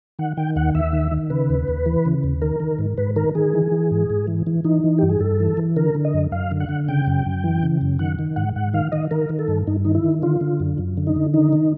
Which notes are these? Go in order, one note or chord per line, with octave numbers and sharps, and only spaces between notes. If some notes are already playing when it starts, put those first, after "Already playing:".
D#3 F#5
D#3 G5
D#2 F#5
D#2 E5
D#3
D#3
C#3 B4
D#2
D#2
E3
C#3
D#2
D#3 A#4
D#3
G#2
G#2 B4
D#3 A#4
D#3 G#4
E3
E3
G#2
G#2
E3
E3
E3 D#4
E3
G2 G4
G#4
G2 A4
E3
E3
D3 A#4
D3
D#5
F#2
F#2 F5
D3
F#5
D3
C#3 G5
F#2
F#2
E3
C#3
F#2
D#3 F#5
D#3
G#2 F#5
G#2 F#5
D#3 F5
D#3 D#5
D#3 A#4
D#3
A4
G2
G2 D#4
D#3 D#4
E4
D#3
D3 F4
D3
F#2
F#2
D3
D#4
D3
D#3 D#4
D#3